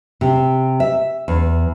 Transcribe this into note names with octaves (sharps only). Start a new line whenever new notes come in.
C3
E5
E2